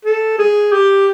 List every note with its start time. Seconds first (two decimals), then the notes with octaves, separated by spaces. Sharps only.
0.05 A4
0.38 G#4
0.72 G4